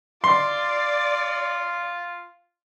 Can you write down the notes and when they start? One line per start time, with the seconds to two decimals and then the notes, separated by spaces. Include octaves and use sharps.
0.24 F4 D5 C6